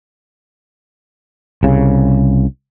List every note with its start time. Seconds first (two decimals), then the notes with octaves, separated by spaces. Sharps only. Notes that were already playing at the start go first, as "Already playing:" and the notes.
1.63 C2 C#3